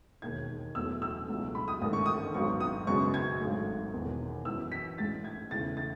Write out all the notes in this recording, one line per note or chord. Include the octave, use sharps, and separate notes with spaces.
E1 D#2 D#3 G#6
E2 B2 F#3 A3 E6
E6
C#2 B2 F#3 A3
B5
D#6
A1 G#2 D#3 A3 D#6
C#6
D#6
G#1 G#2 F#3 B3 C#6
D#6
F#2 C#3 G#3 B3 C#6
G#6
G#1 G#2 F#3 A3
E1 E2 D#3
F#2 E3 B3 E6
B6
A1 A2 G#3 A6
G#6
E2 C#3 E3 A3 A6
A6